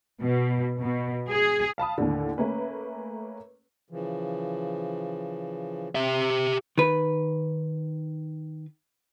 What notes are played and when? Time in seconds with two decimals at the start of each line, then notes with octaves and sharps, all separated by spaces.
0.22 B2
0.78 B2
1.29 G#4
1.78 F5 A5 B5 D#6
1.98 D#2 A2 D3
2.38 A3 A#3 C#4 B4
3.90 C#3 E3 F3
5.95 C4 G4 E5
6.78 D#3 B4